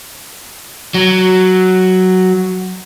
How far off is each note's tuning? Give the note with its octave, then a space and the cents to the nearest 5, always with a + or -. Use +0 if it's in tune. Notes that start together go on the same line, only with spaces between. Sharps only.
F#3 +5